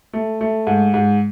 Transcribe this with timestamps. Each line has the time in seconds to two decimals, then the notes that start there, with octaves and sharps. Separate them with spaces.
0.13 A3
0.41 A3
0.67 G#2
0.94 G#2